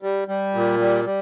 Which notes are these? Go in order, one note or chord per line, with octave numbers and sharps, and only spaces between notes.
G3
G3
A#2
G3
G3